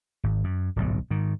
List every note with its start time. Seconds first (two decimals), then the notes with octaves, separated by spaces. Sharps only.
0.24 G#1
0.44 F#2
0.76 D1 B1 G#2
1.10 G#2 D#3